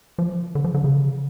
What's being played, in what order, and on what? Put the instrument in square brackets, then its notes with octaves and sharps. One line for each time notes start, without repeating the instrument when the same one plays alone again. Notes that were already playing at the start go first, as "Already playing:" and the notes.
[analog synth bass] F3
D3
F3
D3
C#3